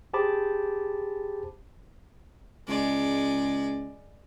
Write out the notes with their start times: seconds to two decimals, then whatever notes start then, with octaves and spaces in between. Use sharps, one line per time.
0.14 G4 G#4 C5 A5 B5 D6
2.68 C#2 G#3 D5